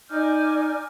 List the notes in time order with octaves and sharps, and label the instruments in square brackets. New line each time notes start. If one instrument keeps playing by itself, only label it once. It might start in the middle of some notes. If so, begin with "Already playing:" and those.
[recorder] D#4 [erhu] D5 [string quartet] G#5 [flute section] F6 G6